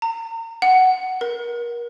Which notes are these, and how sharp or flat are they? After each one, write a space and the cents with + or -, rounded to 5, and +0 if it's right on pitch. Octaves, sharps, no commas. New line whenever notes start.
A#5 -35
F#5 +10
A#4 +30